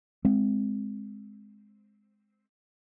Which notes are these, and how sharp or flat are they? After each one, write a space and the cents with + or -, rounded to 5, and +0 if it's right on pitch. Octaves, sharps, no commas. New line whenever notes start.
G#3 +5 C4 +0